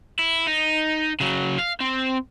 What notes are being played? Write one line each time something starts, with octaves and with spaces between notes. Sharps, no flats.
E4
D#4
C#3 F#3
F5
C4